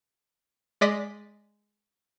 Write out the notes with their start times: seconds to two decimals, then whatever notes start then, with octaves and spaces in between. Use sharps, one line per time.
0.81 G#3 D5 D#5 B6